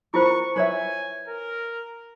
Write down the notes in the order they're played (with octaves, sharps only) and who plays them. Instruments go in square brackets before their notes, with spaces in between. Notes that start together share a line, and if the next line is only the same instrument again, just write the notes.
[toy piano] E4 F4 C5 [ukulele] A#4 [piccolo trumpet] C#6
[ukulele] B4 C#5 E5 [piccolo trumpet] G#5
[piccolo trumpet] A#4